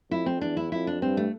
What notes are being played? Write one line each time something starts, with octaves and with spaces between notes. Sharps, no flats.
F2 E4
C4
E2 D4
E4
F2 E4
D4
G2 C4
A3